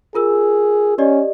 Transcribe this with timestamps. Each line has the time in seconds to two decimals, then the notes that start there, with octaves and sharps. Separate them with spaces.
0.15 F4 G#4 A#4 E6
0.98 C#4 G4 D5 D#5